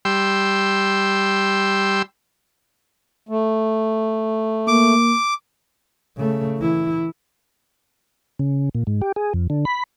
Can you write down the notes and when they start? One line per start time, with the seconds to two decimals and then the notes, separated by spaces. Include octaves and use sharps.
0.05 G3 G5 C6 E6
3.29 A3
4.68 A#3 D6
6.17 C#3 A3
6.58 E3 E4
8.39 C#3
8.75 A#2
8.87 G#2
9.02 G4
9.16 G#4
9.34 F2
9.50 D3
9.65 B5